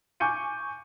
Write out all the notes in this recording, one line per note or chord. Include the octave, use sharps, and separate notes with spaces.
G#5 C#6 D6 G6 C#7 D#7